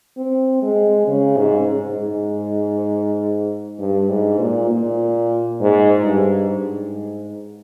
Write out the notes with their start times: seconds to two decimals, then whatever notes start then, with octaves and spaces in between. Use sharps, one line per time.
0.17 C4
0.62 G#3
1.07 C#3
1.37 G#2
1.68 G#2
1.98 G#2
3.79 G2
4.09 G#2
4.39 A#2
4.70 A#2
5.61 G#2
6.05 G2
6.50 G#2